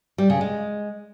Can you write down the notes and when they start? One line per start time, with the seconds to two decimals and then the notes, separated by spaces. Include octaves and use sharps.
0.18 G3
0.30 C#3
0.41 G#3